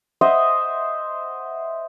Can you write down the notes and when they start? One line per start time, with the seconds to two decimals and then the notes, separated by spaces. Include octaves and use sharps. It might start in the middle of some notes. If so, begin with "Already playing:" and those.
0.21 C5 D#5 E5 F#5